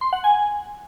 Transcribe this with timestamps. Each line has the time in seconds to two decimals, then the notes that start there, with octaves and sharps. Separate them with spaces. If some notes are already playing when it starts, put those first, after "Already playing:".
0.01 C6
0.13 F#5
0.24 G#5